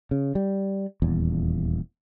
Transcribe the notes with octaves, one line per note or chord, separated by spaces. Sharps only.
C#3
G3
D#1 E2